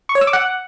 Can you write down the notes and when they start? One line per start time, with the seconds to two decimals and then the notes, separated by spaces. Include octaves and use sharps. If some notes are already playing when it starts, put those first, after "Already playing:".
0.09 C#6
0.15 C#5
0.21 E6
0.27 D6
0.33 F#5